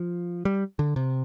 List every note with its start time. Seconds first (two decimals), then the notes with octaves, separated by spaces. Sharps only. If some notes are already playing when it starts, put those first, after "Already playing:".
Already playing: F3
0.45 G3
0.79 D3
0.96 C3